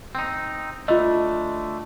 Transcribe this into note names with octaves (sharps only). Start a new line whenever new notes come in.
C4 D#4
D3 A3 F4 D#5